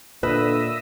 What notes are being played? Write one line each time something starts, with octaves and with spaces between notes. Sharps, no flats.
A#2 D3 B4 D#5 E5